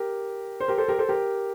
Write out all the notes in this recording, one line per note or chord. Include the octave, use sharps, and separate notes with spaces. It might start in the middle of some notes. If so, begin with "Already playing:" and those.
Already playing: G4 A#4
C5
G4 A#4
A4 C5
G4 A#4
A4 C5
G4 A#4